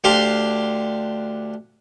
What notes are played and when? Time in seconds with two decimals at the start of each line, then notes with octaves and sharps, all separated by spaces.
0.04 D2 D4 G4 F5 C6